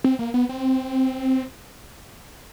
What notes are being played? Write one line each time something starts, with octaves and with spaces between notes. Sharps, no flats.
C4
A#3
B3
C4